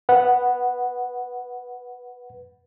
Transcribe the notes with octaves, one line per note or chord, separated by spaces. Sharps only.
B4 F#5